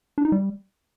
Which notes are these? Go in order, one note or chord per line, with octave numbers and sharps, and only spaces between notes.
D4
D#4
G3